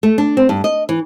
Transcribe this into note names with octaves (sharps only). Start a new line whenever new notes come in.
A3
D4
C4
G2
D#5
E3